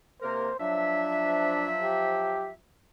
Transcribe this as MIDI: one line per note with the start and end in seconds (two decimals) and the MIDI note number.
0.22 0.50 48
0.22 0.50 58
0.22 0.50 70
0.22 0.59 72
0.60 2.53 53
0.60 2.53 54
0.60 1.75 62
0.60 2.53 76
1.82 2.50 67